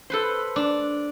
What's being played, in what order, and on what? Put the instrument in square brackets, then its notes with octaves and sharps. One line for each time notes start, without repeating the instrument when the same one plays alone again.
[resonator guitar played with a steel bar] A4 B4 C5
[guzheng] D4